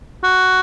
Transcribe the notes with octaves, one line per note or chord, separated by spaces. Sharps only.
F#4